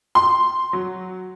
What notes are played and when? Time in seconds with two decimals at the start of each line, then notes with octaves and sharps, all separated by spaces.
0.15 C6
0.73 F#3